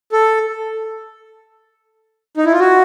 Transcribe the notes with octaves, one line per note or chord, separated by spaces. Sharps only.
A4
D#4
E4
F4
F#4